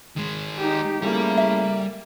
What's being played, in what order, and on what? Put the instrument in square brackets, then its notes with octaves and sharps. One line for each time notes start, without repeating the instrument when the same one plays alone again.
[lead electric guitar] D#3 G#3
[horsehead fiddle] D#4 G4
[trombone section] C#3 A3 E4 [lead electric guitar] G3 [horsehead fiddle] A#3
[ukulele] E5